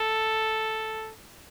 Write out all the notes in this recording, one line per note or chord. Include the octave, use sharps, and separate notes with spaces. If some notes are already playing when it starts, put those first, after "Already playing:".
Already playing: A4